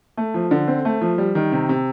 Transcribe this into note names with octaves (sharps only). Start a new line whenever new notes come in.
A3
F3
D3
C4
A3
F3
G3
D#3
C3
C3